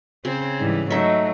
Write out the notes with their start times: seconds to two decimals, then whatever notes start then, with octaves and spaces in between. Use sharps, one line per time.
0.25 C#3 C4 C5
0.60 G#2 E3 G3
0.90 F#3 A3 D#4 E5